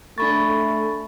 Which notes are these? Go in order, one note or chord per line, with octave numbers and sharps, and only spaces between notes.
A3 D4 B5 C#6 A6